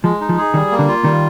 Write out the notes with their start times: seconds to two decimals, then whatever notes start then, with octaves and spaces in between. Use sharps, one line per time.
0.04 F3 G#3
0.21 D#4
0.29 F3
0.38 G#4
0.54 D#3 G3
0.72 A#3
0.79 D3
0.88 F4
1.04 D#3 G3